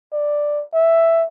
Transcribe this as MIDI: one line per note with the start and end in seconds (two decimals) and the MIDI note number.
0.13 0.63 74
0.74 1.25 76